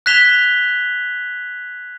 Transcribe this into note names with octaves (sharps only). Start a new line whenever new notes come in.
F#6 G#6 B6 E7 F7 G7